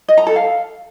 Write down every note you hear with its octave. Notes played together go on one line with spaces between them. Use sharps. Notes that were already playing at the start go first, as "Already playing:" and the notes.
D#5
A#5
A4
F5